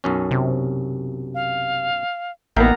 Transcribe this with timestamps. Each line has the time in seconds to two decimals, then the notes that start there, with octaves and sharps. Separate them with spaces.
0.04 B1 F#2 C#4
0.31 C3
1.34 F5
2.56 A1 A#3 B3 D#4 E5 G5 A#5